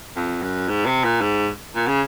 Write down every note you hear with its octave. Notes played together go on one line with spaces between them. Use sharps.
F2
F#2
G#2
C3
A#2
G#2
A#2
C#3